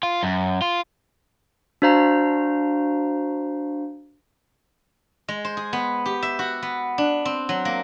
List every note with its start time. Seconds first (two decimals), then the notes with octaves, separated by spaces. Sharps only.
0.03 F4
0.23 F#2
0.62 F4
1.82 D4 F#4 C5 F5 A#5
5.28 G#3
5.45 C5
5.57 G#4
5.73 B3
6.06 G4
6.22 E5
6.39 F#4
6.62 B3
6.98 D4
7.25 C4
7.49 F#3
7.65 A#3